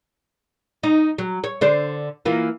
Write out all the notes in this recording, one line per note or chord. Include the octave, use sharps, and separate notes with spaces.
D#4
F#3
C#5
D3 D4 C5
E3 A#3 F4